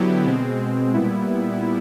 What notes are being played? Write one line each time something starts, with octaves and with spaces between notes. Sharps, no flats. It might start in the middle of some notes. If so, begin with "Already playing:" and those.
Already playing: D3 F#3 B3 E4 G4
B2 G#3 C4
A#2 G3 B3 E4